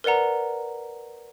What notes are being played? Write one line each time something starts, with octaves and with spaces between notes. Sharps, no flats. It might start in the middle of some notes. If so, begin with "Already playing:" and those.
A#4 B4 D5 F#5 A#5